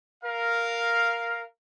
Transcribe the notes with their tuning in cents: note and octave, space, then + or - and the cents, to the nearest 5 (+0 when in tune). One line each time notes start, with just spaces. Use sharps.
A#4 +0 F5 +0